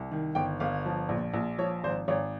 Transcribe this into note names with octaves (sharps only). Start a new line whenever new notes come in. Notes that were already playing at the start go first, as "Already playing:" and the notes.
Already playing: C2
D#3
G1 G5
G1 F5
F3
A#1
A#1
F3 C#5
G#1 C5
G#1 C#5